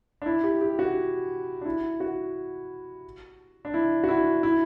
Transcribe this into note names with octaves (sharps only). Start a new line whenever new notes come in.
D4
E4
G4
G4
F#4
D4
E4
F#4
D4
E4
F#4
E4
E4